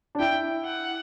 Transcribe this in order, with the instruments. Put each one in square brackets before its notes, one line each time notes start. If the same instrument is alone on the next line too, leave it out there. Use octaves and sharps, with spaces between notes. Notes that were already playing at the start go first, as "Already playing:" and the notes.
[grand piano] D4
[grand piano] E4 [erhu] G5
[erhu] F#5